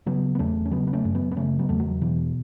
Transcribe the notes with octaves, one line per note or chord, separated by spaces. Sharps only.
C#3 F#3 B3
B3
E2 A3 C#4
C#4
C#3 F#3 B3
B3
A3 C#4
F#2
F#3 B3
B3
C#3 A3 C#4
F#3 B3
E2 A3
F#3
B2 E3